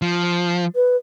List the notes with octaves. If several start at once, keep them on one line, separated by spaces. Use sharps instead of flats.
F3
B4